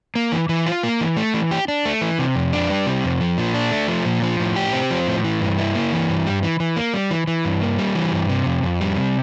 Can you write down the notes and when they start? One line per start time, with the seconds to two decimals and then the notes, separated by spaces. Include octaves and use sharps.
0.15 A#3
0.32 E3
0.49 E3
0.66 F4
0.83 A#3
1.01 E3
1.17 A3
1.34 E3
1.51 G4
1.68 D4
1.85 A3
2.01 E3
2.19 C3
2.36 F2
2.53 D4
2.70 G3
2.86 C3
3.04 F2
3.20 F3
3.38 A#2
3.54 D4
3.72 A3
3.88 F3
4.05 A#2
4.22 F3
4.39 A2
4.56 G4
4.73 C4
4.91 F3
5.07 A2
5.24 E3
5.41 G2
5.58 E4
5.75 A#3
5.92 E3
6.09 G2
6.26 G3
6.43 E3
6.60 E3
6.76 A#3
6.94 G3
7.11 E3
7.27 E3
7.45 G2
7.61 A#3
7.79 G3
7.95 E3
8.13 G2
8.29 C3
8.46 F2
8.63 F2
8.81 G3
8.97 C3